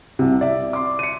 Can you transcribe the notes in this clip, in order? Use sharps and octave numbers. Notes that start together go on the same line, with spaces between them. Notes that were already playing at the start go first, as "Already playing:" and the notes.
C2 C3
D5 E5
C6 D6
C#7 D#7